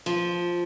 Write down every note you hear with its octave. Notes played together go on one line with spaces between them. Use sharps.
F3